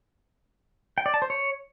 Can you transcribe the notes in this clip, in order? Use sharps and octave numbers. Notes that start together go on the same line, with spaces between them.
G5
D5
A5
C5
C#5